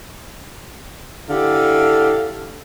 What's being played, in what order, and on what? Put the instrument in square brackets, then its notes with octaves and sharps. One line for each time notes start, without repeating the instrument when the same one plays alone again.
[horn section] D3 E4 G4 A4 F5